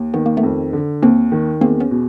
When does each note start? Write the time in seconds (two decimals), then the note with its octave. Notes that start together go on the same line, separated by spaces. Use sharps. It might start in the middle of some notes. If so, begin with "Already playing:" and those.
Already playing: D#2
0.14 D#3 B3
0.26 A#3
0.37 A3 B3
0.43 F2
0.73 D3
1.02 D#2 A#3 C4
1.32 D#3
1.61 E2 A#3 C4
1.80 B3 C#4
1.91 B2